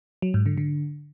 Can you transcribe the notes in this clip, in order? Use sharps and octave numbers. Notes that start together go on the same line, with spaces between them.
F#3
G#2
D3
D3